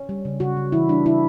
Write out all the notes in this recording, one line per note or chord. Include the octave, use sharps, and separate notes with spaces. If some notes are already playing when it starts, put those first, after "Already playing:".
Already playing: C#4
G3
C#3
C#3 F#4
C#3
E3 E4
G3 D4
C#3 E4